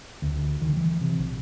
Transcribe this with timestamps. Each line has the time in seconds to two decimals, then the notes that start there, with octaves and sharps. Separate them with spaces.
0.22 D2
0.62 D#3
0.77 E3
1.01 C3
1.19 A#1